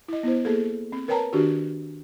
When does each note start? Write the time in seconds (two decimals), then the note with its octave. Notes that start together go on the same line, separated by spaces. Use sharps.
0.08 E4 D#5
0.23 B3 E4 C5
0.45 A#3 G#4 A4
0.92 C4
1.08 A#4 B4 C#5 G5 A5 A#5
1.33 D#3 D4 F#4 G4